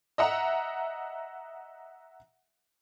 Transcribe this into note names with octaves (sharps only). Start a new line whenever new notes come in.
D#5 E5 F#5 A#5